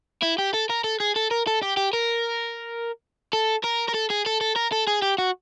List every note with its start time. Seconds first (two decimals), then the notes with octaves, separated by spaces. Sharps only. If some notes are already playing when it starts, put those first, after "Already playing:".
0.23 E4
0.39 G4
0.54 A4
0.70 A#4
0.84 A4
1.00 G#4
1.16 A4
1.31 A#4
1.47 A4
1.63 G4
1.77 G4
1.93 A#4
3.33 A4
3.64 A#4
3.88 A#4
3.94 A4
4.10 G#4
4.26 A4
4.41 A4
4.56 A#4
4.73 A4
4.88 G#4
5.02 G4
5.18 F#4